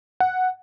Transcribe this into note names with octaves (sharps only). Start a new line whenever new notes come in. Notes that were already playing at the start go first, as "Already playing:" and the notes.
F#5